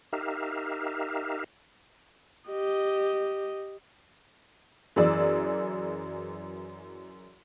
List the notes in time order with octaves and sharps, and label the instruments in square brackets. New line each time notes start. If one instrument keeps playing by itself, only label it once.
[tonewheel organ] D#4 G4 A#4 E5 F5
[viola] G4 D#5
[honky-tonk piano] F#2 E3 G#4 D5 E6